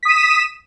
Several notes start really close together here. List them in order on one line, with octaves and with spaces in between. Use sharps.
B6 D#6 D#7 E7